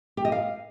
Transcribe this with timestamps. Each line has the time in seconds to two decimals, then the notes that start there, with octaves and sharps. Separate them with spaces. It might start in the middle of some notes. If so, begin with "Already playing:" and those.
0.17 G4
0.25 D#5
0.32 F5